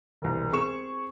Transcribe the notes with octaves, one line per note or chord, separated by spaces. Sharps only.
E1 C2
C4 G#4 C#6 E7